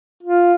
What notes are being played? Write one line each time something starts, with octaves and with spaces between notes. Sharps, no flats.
F4